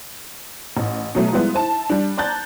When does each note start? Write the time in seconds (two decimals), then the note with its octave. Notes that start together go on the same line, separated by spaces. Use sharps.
0.77 A1
1.15 B2 F#3 A3
1.32 F3 G3 G#3 B3 E4
1.54 E4 C5 A5
1.90 G3 D4
2.17 D5 A5 A#5 F#6 G6 A6